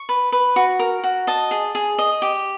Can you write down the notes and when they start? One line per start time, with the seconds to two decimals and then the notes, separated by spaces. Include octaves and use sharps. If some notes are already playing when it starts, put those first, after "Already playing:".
Already playing: C#6
0.09 B4
0.32 B4
0.56 F#4
0.79 A#4
1.04 F#4
1.27 D#5 A5
1.51 G#4
1.75 G#4
1.98 D#5
2.22 G4